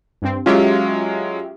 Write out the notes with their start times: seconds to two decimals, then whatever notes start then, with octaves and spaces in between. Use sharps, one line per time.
0.22 G2 C4
0.46 F#3 G#3 C#4 F4 G4 E5